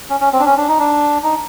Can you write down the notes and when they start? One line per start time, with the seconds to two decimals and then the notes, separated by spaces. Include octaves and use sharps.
0.10 C#4
0.20 C#4
0.33 C4
0.40 D4
0.46 C#4
0.57 D4
0.68 D#4
0.79 D4
1.23 D#4